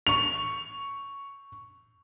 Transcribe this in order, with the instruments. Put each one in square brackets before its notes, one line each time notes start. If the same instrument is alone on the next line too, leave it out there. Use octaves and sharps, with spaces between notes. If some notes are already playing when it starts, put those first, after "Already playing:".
[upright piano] C#6 F7